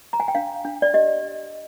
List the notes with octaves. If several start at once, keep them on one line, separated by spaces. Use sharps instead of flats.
A#5
G#5
G5
D4 F5
D4
D5
G4 D#5